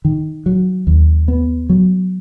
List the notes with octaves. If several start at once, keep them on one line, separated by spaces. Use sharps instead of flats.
D#3
F#3
D#2
B3
F#3